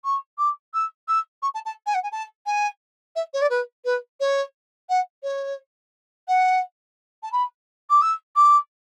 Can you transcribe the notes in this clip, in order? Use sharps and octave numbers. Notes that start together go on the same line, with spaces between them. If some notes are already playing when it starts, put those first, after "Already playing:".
C#6
D6
E6
E6
C#6
A5
A5
G#5
F#5
G#5
A5
G#5
E5
C#5
D5
B4
B4
C#5
F#5
C#5
F#5
A5
B5
D6
E6
D6